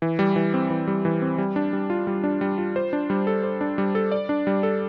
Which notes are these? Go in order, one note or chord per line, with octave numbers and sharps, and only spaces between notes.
E3
G3
E3
C4
E3
G3
E3
C4
G3
D4
G3
F4
G3
D4
G3
F4
C5
D4
G3
A4
C5
D4
G3
A4
D5
D4
G3
A4